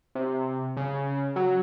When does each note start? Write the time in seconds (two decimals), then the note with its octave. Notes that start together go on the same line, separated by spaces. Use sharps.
0.15 C3
0.77 C#3
1.36 F#3